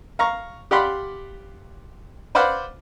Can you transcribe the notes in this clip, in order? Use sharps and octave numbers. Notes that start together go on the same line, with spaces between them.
F5 A#5 C#6
G4 D5 F5 F#5 B5 C6
B4 C5 D5 F5 F#5 B5